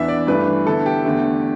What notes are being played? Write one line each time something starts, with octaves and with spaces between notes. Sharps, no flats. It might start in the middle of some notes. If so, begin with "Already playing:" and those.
Already playing: E2 E3 B3 D4 E5
D5
G2 E3 A3 D4 B4
D3 B3 E4 A4
G4
E2 D3 A3